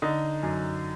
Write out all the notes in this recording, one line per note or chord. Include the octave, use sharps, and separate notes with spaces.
D3 D#4
F#2